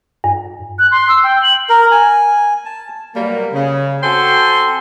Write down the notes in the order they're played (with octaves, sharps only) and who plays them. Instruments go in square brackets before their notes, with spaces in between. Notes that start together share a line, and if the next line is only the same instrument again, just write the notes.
[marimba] G2
[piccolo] F#6
C6
E6
G5
F#7
[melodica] A#4
G#5
A5
[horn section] B2 F#3 G3 A#3
C#3
C4 F#4 A4 G5 G#5 C6